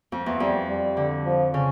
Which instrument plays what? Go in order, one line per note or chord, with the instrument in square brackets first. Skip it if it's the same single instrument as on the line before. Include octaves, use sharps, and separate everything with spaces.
[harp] F2
E2
[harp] F2 [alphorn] G3
[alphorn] G3
[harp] D3
[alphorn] F3
[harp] C#3